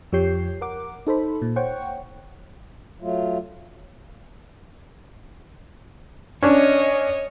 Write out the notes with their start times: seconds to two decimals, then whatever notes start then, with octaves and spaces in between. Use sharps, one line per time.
0.12 F2 F3 G4 C#5 G6 C7
0.61 A#4 F#5 D6
1.07 D#4 A4 C5 B5
1.42 A#2
1.56 C5 C#5 F#5 G5 C#6
3.01 F#3 A3 F4
6.43 C#4 D4 C#5 D#5